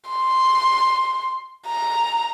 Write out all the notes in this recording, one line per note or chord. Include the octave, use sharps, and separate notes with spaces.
C6
A#5